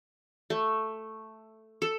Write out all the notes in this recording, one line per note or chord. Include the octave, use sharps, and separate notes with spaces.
A3
A4